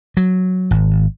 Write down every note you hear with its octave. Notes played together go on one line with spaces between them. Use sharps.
F#3
G#1